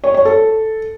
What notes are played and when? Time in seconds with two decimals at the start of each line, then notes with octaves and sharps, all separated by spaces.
0.04 C#5
0.14 C#5
0.25 A4